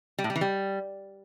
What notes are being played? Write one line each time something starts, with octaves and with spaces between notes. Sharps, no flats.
G3
A2
G3
E3
G3